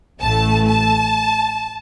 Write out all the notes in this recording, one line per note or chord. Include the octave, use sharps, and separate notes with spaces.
A1 A2 A3 A5
A5